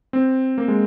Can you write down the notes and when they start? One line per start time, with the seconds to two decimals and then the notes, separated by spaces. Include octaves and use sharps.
0.13 C4
0.58 A#3
0.68 G#3